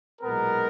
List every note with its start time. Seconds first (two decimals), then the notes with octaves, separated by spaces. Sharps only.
0.21 B1 A#2 G#3 B3 A#4